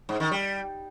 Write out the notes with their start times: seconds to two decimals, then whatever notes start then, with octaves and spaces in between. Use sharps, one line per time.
0.09 G#2
0.20 D#3
0.31 G3